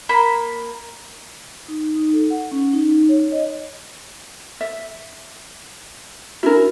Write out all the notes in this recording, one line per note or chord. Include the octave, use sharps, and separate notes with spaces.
A#3 B5
D#4
D#4
A4
F#5
C#4
D#4
C#5
D#5
E5
D4 E4 F#4 A#4